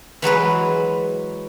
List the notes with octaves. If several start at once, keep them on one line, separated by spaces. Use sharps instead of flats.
E3 F#3 G#3 B4